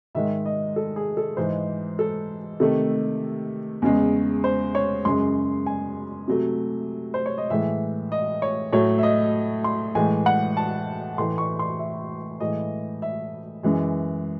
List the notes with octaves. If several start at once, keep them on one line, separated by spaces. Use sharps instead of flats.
G#2 D#3 G#3 E5
D#5
A4
G#4
A4
G#2 E3 G#3 C5
A4
C3 D#3 A3 A4
E2 C#3 G#3
C5
C#5
F#2 C#3 G#3 C6
G#5
C3 F#3 A3
C5
C#5
D#5
A2 E3 G#3 E5
D#5
C#5
A2 F#3 A3 C#5
E5
D#5
C6
A2 E3 G#3 G#5
F#5
A5
A2 E3 A3 C6
C#6
C6
E5
A2 E3 G#3 D#5
E5
F#2 E3 G#3